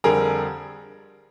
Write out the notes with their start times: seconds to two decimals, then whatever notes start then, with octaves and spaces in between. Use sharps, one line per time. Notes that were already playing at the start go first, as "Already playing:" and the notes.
0.04 F2 D3 G3 G#4 A#4